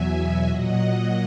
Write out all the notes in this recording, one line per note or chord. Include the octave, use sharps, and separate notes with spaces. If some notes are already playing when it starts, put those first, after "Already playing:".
Already playing: E2 B2 F#3 E5 G#5
E5 G#5
A#2 F#3 D#5 F#5